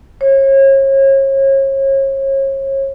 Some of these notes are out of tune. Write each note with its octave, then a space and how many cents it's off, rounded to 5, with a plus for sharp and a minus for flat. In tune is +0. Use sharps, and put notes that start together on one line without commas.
C#5 -35